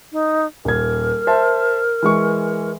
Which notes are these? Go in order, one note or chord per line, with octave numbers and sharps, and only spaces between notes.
D#4
D#1 A#4 G#6
C5 E5 A5
E3 G#3 C#6